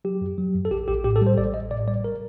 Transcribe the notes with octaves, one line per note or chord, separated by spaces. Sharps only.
F#3 G4
F#2
F#3
F#2
A4
A#1 G4
A#1 G4
A2 G4
A4
G3
C5
A1 D5
A1 D#5
A2 D5
G3 D5
A#4